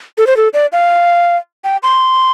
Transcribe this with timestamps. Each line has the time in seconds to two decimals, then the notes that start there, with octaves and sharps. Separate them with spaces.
0.18 A4
0.27 C5
0.37 A4
0.53 D5
0.72 F5
1.64 G5
1.83 C6